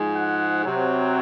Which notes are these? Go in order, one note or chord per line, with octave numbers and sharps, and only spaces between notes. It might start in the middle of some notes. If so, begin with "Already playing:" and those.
Already playing: G#2 F3 G#3
F#5
C3 F#3